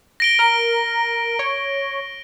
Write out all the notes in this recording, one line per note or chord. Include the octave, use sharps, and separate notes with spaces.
A#6 D7 G7
A#4
C#5